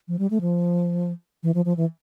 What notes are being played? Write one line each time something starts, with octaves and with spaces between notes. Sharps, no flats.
F3
G3
A3
F3
E3
F3
F3
E3